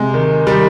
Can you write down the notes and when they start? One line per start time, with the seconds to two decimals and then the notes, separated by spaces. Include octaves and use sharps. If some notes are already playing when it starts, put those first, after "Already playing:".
Already playing: C3 G#3
0.14 D#3
0.46 D#3 G3